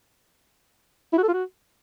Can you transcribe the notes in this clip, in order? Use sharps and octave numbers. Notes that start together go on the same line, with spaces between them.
E4
F#4
A4
F4
F#4